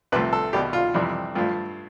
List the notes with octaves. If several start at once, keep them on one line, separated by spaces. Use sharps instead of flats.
C2 C3 F3 A3 B4
A4
C2 B2 G3 G4
F4
F2 C3 E3 G3
G2 F3 A3 F4